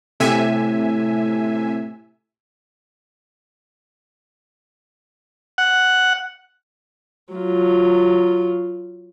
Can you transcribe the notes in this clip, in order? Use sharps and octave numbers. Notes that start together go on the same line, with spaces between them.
A2 C3 A4 E5 G5 G#5
F#5
F#3 F4